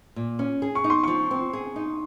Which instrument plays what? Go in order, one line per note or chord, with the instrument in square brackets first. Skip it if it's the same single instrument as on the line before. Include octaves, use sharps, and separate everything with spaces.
[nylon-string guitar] A#2
C#4
G#4
[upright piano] C#6
[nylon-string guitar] D#4
[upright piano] C6
[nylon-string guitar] F3 [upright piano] C#6
[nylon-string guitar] C4
G#4
D#4